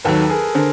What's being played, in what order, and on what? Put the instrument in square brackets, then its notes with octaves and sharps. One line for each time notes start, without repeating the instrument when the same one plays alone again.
[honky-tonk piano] D#2 D#3 F#3 [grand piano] A4 B4
[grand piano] G#4 A#4
[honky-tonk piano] D3 [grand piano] A#4 C5